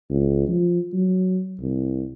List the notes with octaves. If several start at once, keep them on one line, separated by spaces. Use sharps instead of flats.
C#2
F3
F#3
C2